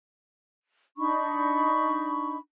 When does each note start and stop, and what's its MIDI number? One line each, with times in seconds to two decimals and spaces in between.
0.97 2.37 62
0.97 2.37 63
0.97 2.37 83
0.97 2.37 85